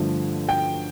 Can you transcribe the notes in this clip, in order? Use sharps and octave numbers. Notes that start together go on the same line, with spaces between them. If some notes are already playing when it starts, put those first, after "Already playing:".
Already playing: G2 D3 F3 A3
G5